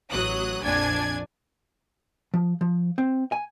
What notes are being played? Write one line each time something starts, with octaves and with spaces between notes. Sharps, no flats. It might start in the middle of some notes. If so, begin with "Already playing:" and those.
A1 F#3 D#6 F#6
A#1 F2 D4 D5 G#5 G#6
F3
F3
C4
G#5